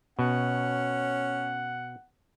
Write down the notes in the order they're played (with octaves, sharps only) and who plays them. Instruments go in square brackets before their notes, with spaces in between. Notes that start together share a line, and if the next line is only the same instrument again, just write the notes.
[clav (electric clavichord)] B2 [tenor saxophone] C#4 [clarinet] F#5